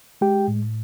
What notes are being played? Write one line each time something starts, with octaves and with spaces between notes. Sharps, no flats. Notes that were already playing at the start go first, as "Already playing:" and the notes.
G#3 G4 G5
A2